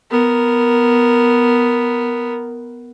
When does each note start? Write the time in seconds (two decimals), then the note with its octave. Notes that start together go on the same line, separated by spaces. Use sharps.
0.11 B3 A#4